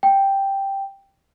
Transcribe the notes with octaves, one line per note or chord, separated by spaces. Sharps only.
G5